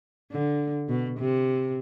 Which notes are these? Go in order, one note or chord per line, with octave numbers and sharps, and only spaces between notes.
D3
B2
C3